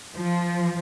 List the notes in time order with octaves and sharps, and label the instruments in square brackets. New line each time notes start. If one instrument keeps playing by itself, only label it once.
[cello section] F3